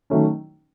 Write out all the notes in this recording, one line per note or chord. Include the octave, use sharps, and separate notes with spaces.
D#3 F#3 A3 C#4